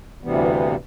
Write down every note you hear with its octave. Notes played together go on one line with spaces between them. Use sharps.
D2 G2 C3 E3 G3 B3